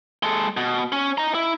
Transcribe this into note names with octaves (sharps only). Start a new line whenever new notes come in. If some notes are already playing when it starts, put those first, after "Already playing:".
G#3 A4
B2
C#4
D#5 A#5
E4